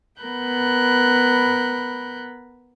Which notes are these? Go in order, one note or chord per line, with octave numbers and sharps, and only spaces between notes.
B3 A#4 B5 F#6 G6